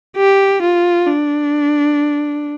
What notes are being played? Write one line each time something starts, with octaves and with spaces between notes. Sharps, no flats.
G4
F4
D4